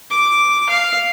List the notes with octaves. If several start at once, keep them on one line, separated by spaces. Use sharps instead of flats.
D6
F5